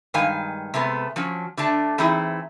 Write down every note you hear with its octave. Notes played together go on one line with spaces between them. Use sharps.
G2 D#3 G#3 F5 G#5
C3 G#3 A3 B3
F3 F#3 C#4
D3 A3 D4 A5
E3 A3 C4 D#4 E4 G#4